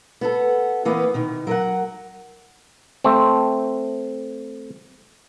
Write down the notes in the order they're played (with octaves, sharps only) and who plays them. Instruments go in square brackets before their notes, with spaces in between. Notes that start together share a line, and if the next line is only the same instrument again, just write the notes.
[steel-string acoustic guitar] B3 F#4 A4
E3 A#3 B3
B2 D#3
F#3 A#4 F#5
[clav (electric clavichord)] A3 C4